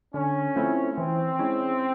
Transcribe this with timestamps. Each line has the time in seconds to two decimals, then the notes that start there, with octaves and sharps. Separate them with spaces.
0.14 D3 C#4
0.56 F3 A3 C4 E4
0.97 E3 C4
1.39 G#3 C#4 E4